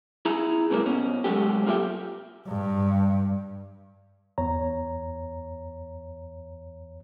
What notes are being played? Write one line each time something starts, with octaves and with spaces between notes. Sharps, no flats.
E4 G#4 A#5
F#2 A2 C3 F#3 A#3
B2 C#4
C2 F#3 G#3 A3 G4
A#3 F4 G4 D5 E5 G5
G2
E2 C#5 A#5